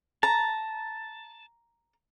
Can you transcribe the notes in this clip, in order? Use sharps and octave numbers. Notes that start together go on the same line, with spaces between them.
A5 A#5